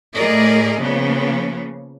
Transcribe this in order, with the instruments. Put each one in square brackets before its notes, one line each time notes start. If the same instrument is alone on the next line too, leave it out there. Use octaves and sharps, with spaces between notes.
[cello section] A2 A3 G#4 A#4 D5 D#5
C#3 F3 A#3 B3